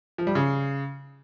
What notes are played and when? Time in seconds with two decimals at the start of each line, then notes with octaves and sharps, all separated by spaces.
0.18 F3
0.27 G3
0.35 C#3